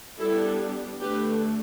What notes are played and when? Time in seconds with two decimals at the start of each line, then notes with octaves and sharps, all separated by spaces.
0.20 G3 B3 D4 E4 A4
1.01 D3 A3 D4 G4 B4